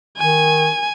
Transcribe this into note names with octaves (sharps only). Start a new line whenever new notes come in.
D#3 G#5